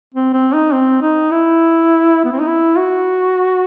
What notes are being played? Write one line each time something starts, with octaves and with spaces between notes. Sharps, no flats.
C4
C4
D#4
C4
D#4
E4
B3
C4
D#4
E4
F#4